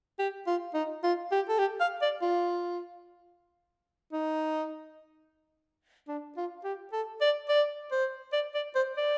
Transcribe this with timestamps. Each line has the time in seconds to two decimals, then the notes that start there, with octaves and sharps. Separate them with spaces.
0.19 G4
0.47 F4
0.74 D#4
1.03 F4
1.32 G4
1.49 A4
1.58 G4
1.80 F5
2.02 D5
2.22 F4
4.13 D#4
6.08 D4
6.37 F4
6.64 G4
6.92 A4
7.21 D5
7.49 D5
7.91 C5
8.33 D5
8.54 D5
8.75 C5
8.97 D5